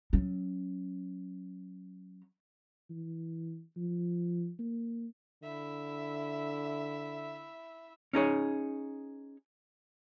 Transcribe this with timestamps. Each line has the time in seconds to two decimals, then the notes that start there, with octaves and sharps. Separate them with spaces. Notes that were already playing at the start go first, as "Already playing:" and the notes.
0.13 F#3 C#4
2.90 E3
3.76 F3
4.59 A#3
5.43 D3 E4 E5
8.13 C#4 D#4 G#4 C#5